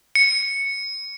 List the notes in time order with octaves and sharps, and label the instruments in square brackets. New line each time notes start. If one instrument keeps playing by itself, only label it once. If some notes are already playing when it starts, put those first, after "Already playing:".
[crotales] C#7